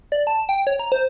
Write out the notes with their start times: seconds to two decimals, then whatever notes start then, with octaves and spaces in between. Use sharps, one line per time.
0.12 D5
0.27 A5
0.49 G5
0.67 C#5
0.79 A#5
0.92 C5